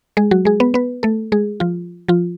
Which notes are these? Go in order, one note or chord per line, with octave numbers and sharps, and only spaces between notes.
G#3 G#4
F#3 F#4
G#3 G#4
B3 B4
B3 B4
A3 A4
G#3 G#4
F3 F4
F3 F4